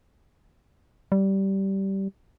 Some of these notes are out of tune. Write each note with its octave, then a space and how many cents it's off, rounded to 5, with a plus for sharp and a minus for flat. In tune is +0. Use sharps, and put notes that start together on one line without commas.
G3 -15